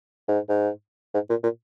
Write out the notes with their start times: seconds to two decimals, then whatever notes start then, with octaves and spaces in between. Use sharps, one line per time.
0.28 G#2
0.49 G#2
1.14 G#2
1.30 A#2
1.43 A#2